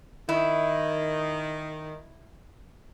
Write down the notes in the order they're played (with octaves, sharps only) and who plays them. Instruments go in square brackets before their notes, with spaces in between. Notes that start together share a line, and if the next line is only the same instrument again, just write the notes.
[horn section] D#3 [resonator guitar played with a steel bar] E4